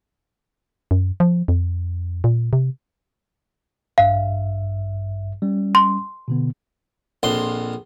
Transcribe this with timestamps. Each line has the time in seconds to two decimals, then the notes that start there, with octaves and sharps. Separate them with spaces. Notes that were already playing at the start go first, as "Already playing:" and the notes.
0.91 F#2
1.20 F3
1.48 F2
2.24 A#2
2.53 C3
3.98 A1 G2 E5 F5
5.42 G3 C#4
5.75 C6
6.28 B2 D3 B3
7.23 A#1 F2 C6